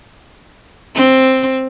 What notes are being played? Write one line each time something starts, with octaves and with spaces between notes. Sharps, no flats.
C4